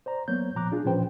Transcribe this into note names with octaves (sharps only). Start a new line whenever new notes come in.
C5 D5 A#5
F#3 A#3 B3 C#5 G6
A#2 F3 A#5 D6 F#6
D4 F4 G#4
A#2 F3 C#4 B4 C5 G5